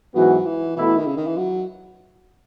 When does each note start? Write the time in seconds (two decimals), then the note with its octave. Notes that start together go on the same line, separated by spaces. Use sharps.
0.15 G#2 E3 F#3 B3 F#4
0.45 E3
0.76 B2 E3 A3 E4
0.87 E3
0.97 D#3
1.07 C#3
1.17 D#3
1.27 E3
1.37 F#3